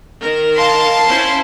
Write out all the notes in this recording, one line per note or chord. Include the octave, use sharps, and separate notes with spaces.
D#3 A#4
F5 A5 C6
C#4 E4 C5